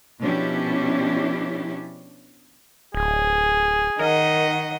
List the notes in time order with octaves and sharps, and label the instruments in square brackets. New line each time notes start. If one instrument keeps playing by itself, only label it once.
[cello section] B2 F3 C#4 D4 E4 G4
[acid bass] D1 [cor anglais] G#4
[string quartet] D#3 D#5 F#5 [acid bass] A#4